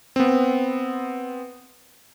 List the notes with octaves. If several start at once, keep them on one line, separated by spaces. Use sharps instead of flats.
B3 C4